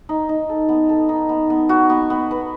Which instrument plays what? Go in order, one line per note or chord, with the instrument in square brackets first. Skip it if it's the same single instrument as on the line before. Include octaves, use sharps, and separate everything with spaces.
[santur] D#4
D#4
A4
B3
A4
D#4
B3
B3
F#4
B3
B3
B4